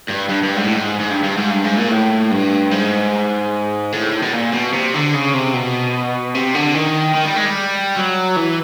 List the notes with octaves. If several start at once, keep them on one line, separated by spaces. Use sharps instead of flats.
G2
G2
G2
G#2
A2
G#2
G#2
G2
G2
G#2
G2
G#2
A#2
A2
G2
G#2
A2
B2
A#2
B2
C3
D3
C#3
C3
B2
C3
D3
D#3
D#3
G3
G#3
G3
F#3
E3